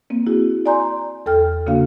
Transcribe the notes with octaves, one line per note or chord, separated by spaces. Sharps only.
A#3 C4
E4 F#4 G#4
D5 G#5 A#5 C6 G6
E2 A4 G5 F6
C#3 A#3 D4 F#4 F5